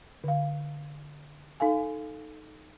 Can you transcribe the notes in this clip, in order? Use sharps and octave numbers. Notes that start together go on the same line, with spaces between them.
D3 F5
D#4 A4 F5 G#5